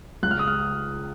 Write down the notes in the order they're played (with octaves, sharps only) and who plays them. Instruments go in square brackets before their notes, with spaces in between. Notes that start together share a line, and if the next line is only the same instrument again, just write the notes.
[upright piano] C#2 C#3 G#3 [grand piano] F#6
[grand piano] F6
D#6
F6